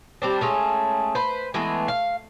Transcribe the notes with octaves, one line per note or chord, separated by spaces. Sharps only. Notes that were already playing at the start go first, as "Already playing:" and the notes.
G3 C4 D4
G#3 A3 C#4
B4 C5
E3 G#3 A3 B3
F5